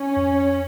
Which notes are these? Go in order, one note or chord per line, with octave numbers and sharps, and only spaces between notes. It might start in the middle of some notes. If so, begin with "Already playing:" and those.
Already playing: C#4
F2